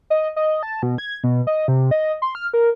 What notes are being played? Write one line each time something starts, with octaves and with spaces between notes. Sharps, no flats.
D#5
D#5
A5
B2
G#6
B2
D#5
C3
D#5
C6
F6
A#4